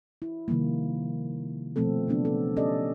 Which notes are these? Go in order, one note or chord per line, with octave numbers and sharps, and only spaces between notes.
E4
C3 D#3 F3 G3 A#3
B2 F3 A3 C4 A4
C#3 F#3 B3 D4
A4
C#4 G4 A4 D5 D#5